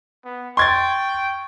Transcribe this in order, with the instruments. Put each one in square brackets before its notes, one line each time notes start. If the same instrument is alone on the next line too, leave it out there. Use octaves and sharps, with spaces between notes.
[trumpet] B3
[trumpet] G5 [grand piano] C6 G#6 A6 [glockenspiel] C#6